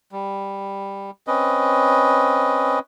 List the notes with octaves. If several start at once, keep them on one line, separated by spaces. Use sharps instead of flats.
G3
C4 C#4 B4 D#5